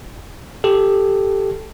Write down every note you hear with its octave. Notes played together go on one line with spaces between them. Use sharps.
G4 A4